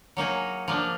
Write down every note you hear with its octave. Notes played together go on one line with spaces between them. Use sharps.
F#3 A#3 D#4 G#4
F3 A#3 D4